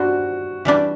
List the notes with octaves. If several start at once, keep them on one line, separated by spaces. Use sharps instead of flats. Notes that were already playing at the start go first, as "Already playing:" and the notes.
Already playing: G3 D4 F#4 C5
E3 G3 D4 G4